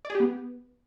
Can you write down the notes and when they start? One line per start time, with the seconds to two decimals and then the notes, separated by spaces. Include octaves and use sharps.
0.05 D5
0.10 G#4
0.15 G4
0.20 B3